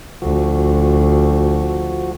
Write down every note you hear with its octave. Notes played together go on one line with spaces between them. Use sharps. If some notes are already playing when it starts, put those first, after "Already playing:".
D2 F3 F#4